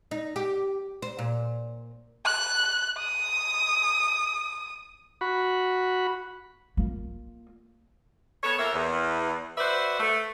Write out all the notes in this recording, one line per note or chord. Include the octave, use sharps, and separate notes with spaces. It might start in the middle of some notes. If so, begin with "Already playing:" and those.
D#4
G4
C5
A#2
F#6
D#6
F#4 B5
A#3 F4
B3 A4 C#5
F2 A#3 A#4 E5
E2
F#4 B4 C5 D5 E5
A3